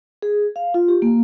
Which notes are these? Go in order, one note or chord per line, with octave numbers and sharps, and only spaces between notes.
G#4
F5
F4
G4
A#3